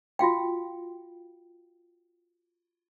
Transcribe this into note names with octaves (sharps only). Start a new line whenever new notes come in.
F4 F#4 F5 G5